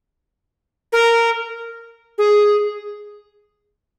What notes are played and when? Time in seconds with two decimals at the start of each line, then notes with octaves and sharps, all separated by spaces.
0.93 A#4
2.18 G#4